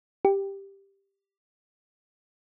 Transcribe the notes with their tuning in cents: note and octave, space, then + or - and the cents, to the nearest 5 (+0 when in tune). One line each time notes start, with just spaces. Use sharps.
G4 +5